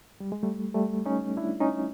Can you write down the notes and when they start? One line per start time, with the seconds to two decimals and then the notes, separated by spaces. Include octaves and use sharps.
0.20 G3
0.32 G#3
0.43 G3 A3
0.74 G3 A3
1.06 C#4 D#4
1.37 D4 E4
1.61 C#4 D#4